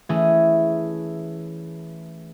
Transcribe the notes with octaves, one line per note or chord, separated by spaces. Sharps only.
E3 A3 C#4 G#4